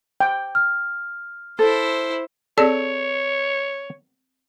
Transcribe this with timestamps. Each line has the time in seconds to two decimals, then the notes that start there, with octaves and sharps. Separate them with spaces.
0.20 G5
0.55 F6
1.59 E4 A4 C5
2.58 C4 G#4 A4 C#5 D5